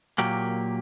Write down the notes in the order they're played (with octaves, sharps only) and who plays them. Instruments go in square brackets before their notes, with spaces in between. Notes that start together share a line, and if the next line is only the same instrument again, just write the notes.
[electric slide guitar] A#2 F#3 A#3 G4